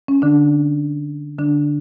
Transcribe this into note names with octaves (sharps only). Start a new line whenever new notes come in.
C#4
D3 D4
D3 D4